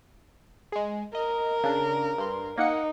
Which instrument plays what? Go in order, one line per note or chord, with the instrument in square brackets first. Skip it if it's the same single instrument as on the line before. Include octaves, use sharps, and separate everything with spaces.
[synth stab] G#3 G#4
[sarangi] A#4 [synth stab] D#5
[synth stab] C#3 D4
G2 C6
[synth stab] A#3 F#5 C#7 [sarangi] D#4